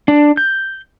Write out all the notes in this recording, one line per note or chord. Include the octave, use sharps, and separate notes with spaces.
D4
G6